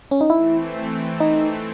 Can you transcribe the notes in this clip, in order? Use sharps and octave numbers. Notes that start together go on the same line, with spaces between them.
C#4
D#4
E3 A3 C4 E4
D#4